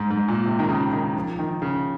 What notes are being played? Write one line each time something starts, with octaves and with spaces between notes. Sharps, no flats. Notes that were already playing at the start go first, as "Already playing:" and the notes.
Already playing: G#2
G#2
A#2
C3
D#3
C#3
D#3
F3
D#3
C#3